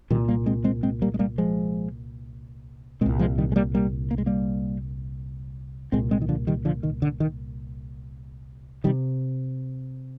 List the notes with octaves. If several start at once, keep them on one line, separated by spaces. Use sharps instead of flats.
C2 A#2 D#3 G3
G3 A#3
G#3 C4
G#3 C4
G#3 C4
G3 A#3
G#3
G3 A#3
F3 G#3
C2 A#2 G#3 C4
F3 G#3
D#3 G3
G#3
G3 A#3
G3 A#3
A#3
G#3
G3 A#3
C2 A#2 G#3 C4
G#3 C4
D#3
D3 F3
D#3 G3
D3 F3
D#3
D3
D#3
C3 D#3 G3